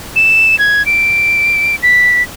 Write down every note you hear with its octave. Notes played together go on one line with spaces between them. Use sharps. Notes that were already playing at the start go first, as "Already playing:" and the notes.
E7
G#6
D7
B6